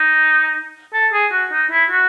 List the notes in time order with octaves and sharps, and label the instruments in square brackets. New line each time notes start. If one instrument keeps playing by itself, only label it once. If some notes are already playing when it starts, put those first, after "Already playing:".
Already playing: [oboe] D#4
A4
G#4
F#4
D#4
E4
F#4